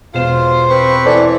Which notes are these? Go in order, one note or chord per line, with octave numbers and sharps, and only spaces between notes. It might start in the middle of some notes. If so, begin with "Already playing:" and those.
E1 B2 F4 C5 E7
C4 B4 C#6
E3 A4 C5 D5